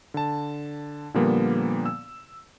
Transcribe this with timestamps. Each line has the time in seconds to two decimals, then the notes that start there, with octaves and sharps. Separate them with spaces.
0.14 D3 A5
1.14 A#2 D3 F3 G3 A#3 B3
1.86 E6